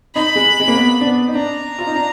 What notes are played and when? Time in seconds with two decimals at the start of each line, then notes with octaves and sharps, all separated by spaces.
0.15 D#4 B5
0.35 G#3
0.60 G#3
0.68 A#3
0.75 B3
1.01 D4
1.05 B3
1.28 D#4
1.35 D4 A#5
1.79 F4
1.87 D#4
1.95 D4